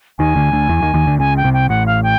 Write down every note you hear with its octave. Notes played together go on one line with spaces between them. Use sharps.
D#2 D#3 G#5
D2 D3
D2 D3
E2 E3
D#2 D#3
D#2 D#3
D2 D3
C#2 C#3 G#5
G5
C2 C3
G5
A1 A2 F#5
F5
G5